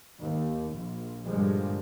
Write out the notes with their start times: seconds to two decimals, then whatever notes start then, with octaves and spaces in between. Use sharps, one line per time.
0.20 D#2
0.73 A#1
1.26 G2 A#2 D3 F3 G3 G#3